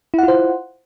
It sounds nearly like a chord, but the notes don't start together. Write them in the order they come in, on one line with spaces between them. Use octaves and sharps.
E4 F#5 F4 C5